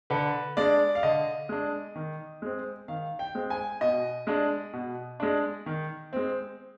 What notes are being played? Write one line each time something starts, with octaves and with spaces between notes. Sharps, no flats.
D3 B4
G#3 D4 D5
F5
D3 D#5
G#3 D4
D#3
G#3 C4
D#3 F5
G5
G#3 C4
G#5
B2 D#5
G#3 D4
B2
G#3 D4
D#3
G#3 C4